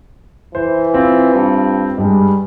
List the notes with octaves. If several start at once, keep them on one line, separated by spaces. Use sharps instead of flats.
E3 C5
C4 F4
G2
G2 G3 G#3